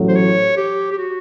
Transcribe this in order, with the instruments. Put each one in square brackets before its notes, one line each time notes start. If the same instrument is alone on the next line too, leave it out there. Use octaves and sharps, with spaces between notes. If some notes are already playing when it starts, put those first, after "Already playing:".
Already playing: [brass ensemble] A1 A2 F#3
[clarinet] C5
C#5
G4
G4
F#4